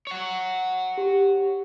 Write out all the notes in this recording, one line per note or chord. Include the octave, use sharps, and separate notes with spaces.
C#5 F#5
G4